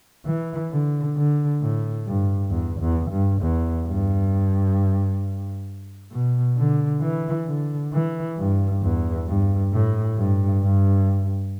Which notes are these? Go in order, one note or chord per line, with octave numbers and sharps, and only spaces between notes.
E3
D3
D3
A2
G2
E2
E2
G2
E2
G2
B2
D3
E3
D3
E3
G2
E2
G2
A2
G2
G2